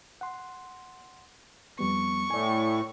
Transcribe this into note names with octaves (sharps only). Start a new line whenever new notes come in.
F#5 C6
F2 G3 B3 C#6
A2 D5 G#5